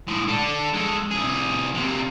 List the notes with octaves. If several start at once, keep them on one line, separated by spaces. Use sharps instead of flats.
A2 G#3
D4 A4
G#3 A4
C2 G#4
C3 A#3